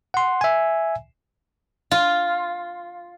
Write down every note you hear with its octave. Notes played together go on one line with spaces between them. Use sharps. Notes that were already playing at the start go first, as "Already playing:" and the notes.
F#5 C6
E5 G#5
F4